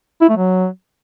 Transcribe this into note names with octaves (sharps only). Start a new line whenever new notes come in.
E4
A3
F#3